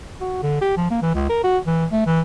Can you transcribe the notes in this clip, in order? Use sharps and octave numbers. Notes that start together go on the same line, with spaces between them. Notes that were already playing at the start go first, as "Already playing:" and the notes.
F#4
D3
G4
F3
A#3
E3
C#2
A#4
F#4
E3
A3
E3